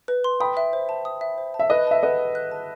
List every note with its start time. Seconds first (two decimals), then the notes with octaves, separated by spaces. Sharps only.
0.08 B4
0.24 C6
0.40 G5 B5 D#6
0.57 E5
0.73 C5
0.89 A5
1.05 D#6
1.21 E5
1.38 C5
1.54 A5
1.59 E5
1.70 B4 D#5 F#6
1.87 E5 A5
2.02 B4 D#5 F#5
2.18 D#6
2.35 F#6
2.52 A5